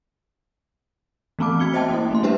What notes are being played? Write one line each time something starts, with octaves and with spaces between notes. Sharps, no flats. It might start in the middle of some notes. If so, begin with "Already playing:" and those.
E3 A3 B3 C4 A5 D6
A3 F#4 G#6 C#7 G7
C5 D#5 E5 G5 A5
A#3 C#4 E4
A3 A#3 C6
G3 D4 G4 B4 C5 E5